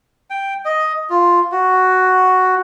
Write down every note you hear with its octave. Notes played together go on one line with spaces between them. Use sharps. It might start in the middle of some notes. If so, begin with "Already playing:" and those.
G5
D#5
F4
F#4